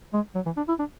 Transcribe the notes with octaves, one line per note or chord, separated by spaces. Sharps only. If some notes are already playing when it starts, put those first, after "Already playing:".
G#3
F#3
E3
D4
E4
D4